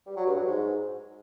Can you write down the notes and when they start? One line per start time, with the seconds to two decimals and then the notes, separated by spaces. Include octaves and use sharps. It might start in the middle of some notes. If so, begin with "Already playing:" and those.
0.07 G3
0.17 F#3
0.27 G2
0.37 F#3
0.47 G#2